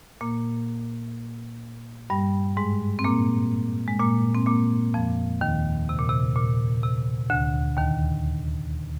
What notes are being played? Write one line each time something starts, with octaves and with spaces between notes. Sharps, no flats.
A#2 A#3
G2 G3
G#2 G#3
C4
A#2 A#3
G#3
A#2 A#3
C4
A#2 A#3
F2 F3
D#2 D#3
C3
A#2
C3
A#2
C3
D2 D3
D#2 D#3